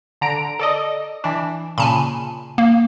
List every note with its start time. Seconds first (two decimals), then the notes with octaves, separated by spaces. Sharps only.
0.21 D3 A#5 D7
0.59 A4 D5 D#5
1.24 E3 D4
1.78 A#2 C#3 G#5 A5 B5
2.58 A#3